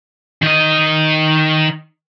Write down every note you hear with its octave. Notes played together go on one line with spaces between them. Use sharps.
D#3 D#5